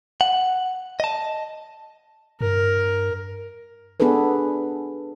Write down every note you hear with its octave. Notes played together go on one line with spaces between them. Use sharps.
F#5
D#5 A5
G2 A#4
B3 D4 G#4 A4 B4